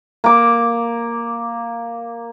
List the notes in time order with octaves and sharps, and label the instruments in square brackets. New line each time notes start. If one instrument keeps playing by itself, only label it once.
[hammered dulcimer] A#3 D6